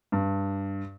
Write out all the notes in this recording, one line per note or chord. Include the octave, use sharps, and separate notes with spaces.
G2